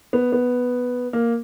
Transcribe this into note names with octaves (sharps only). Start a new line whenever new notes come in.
B3
B3
A#3